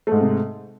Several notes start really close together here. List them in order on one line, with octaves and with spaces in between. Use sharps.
A3 G#2 G#3 C3